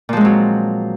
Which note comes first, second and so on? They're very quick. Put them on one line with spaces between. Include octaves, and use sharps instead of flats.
A#2 F3 G#3 C4 F#3